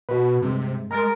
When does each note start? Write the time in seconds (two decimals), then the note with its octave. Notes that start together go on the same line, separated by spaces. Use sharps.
0.09 B2 F#4 B4
0.42 G2 C3 G#3
0.91 G#3 A#4 A#5 A6